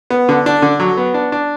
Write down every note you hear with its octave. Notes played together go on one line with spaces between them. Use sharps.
B3
D3
D4
D3
F#3
B3
D4
D4